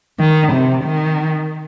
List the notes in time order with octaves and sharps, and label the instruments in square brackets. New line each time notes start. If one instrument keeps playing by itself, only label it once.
[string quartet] D#3
C3
D#3